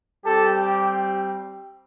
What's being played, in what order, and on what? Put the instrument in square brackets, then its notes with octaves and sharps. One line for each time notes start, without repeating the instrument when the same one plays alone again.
[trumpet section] G3 C4 G4 A4